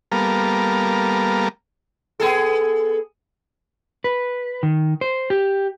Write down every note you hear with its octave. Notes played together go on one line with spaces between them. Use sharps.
G3 A#3 B3 A4 A#4 F5
B3 G#4 A4
B4
D#3
C5
G4